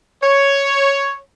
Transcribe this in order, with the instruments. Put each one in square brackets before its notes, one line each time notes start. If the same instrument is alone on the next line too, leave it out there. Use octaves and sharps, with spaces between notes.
[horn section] C#5